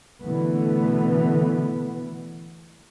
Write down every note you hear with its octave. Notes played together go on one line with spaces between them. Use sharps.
B2 D3 E3 A3 B3